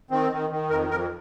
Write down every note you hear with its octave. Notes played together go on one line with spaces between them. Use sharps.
D#3 C4
D#3
D#3
F2 A#4
F2 A#4